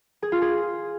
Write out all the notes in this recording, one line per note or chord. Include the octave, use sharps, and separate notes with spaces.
G#4
F4
G#4